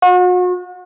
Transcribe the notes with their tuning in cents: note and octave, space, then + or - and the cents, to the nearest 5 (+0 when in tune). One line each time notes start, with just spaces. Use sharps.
F#4 -40